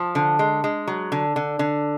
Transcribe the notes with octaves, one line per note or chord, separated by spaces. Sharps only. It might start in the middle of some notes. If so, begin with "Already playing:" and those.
Already playing: F3
D3
G#3
G#3
F#3
D3
D3
D3